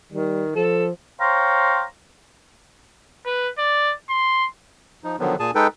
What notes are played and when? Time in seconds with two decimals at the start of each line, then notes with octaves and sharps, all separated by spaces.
0.12 D#3 G3
0.55 F3 A4
1.19 C5 C#5 F5 G5 A#5 C6
3.26 B4
3.58 D5
4.10 C6
5.04 F3 D#4
5.20 D3 D#3 F3 F#3 B3
5.40 A#2 G#4 G#5 A5
5.55 G#3 D#4 A4 B4 G5